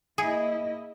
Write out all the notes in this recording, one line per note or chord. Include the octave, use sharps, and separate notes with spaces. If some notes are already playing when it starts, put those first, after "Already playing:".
A#3 E4 G#4 D#5